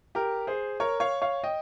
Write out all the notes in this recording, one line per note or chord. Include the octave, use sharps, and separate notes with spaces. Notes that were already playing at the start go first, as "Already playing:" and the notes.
G4 A#4
G#4 C5
A#4 C#5
C#5 F5
C#5 F5
D#5 G5